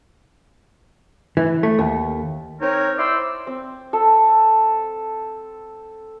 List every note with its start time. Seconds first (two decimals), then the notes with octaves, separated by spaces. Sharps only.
1.37 E3
1.63 A3
1.79 D#2
2.61 C4 D#4 A#4 C#5
2.98 E4 C5 D5 C6 E6
3.47 C4
3.93 A4